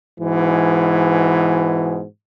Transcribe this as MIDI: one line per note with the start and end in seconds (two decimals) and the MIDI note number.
0.20 2.04 44
0.20 2.04 47
0.20 2.04 52